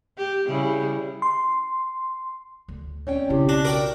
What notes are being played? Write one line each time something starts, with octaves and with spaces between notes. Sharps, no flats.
G4
C#3 G3 E4
C6
D2
C4 C#4 C#5 D5 G5
B1 C#3 E4 G4 D6
D4 A#6
F#4 A#4 D5 G5